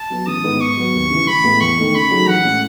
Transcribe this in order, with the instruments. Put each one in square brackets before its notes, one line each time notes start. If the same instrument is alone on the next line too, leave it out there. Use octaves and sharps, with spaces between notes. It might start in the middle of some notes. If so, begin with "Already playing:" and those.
Already playing: [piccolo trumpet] A5
[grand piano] F#3 B3
[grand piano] A1 [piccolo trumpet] D#6
[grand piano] G#2 D#3 G#3 B3
[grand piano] G#2 [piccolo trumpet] C#6
[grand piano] F#3 B3
D#2
C#3 E3
[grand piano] A1 [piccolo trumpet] B5
[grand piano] A2 G#3 B3
[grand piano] E2 [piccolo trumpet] C#6
[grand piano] D#3 A3
[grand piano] C#3 [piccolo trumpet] B5
[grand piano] F#3 A3 D#4 G#4
[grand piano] A1 [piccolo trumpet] F#5
[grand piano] A2 G#3 C#4